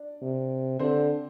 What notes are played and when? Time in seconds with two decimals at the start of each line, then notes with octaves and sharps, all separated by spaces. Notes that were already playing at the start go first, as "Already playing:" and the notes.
Already playing: D4 D5
0.22 C3
0.79 D3 C4 C5